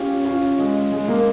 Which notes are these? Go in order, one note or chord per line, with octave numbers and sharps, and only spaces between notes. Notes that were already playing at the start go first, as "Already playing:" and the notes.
Already playing: C#4 F4 G4
C#4 F4
G#3
G#3
A#3